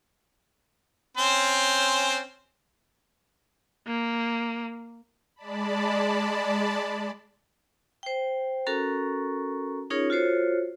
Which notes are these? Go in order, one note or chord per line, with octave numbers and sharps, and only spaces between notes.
C4 C#4 C5
A#3
G#3 D5 A5 B5
C5 G5
C#4 F#4 A4 A#4 A#5 C#6
C#4 D#4 F4 G#4 A#4 C#5
F4 F#4 A4 C5 C#5